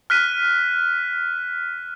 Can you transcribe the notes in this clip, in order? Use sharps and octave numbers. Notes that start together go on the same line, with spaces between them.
F6 F#6 B6 D#7